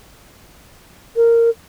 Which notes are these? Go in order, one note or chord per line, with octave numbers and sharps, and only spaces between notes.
A#4